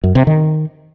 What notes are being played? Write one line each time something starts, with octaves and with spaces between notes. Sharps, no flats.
F#2
C3
D#3